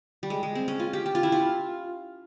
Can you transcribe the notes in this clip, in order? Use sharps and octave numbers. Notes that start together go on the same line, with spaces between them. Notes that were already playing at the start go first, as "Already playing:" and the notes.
G3
G#3
G#3
C4
C#4
F4
G4
G4
F4
E4
F4